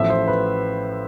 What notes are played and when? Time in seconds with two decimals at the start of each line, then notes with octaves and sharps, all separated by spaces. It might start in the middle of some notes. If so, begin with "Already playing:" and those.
Already playing: A1 A2 F3 E5
0.10 C5
0.28 B4